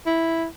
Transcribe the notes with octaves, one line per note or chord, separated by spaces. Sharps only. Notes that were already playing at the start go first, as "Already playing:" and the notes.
E4